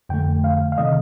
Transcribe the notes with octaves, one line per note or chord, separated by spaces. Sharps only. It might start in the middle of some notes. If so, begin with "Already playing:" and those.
F2 D3 A3 G5
F5
F5
C3 D#3 A3 D#5